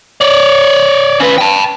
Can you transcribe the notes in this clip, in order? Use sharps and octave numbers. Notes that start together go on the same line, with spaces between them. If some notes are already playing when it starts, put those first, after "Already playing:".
C#5 D5
C#3 B4
G5 A5